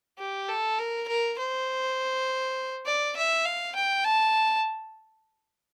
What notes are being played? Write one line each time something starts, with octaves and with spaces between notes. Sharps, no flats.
G4
A4
A#4
A#4
C5
D5
E5
F5
G5
A5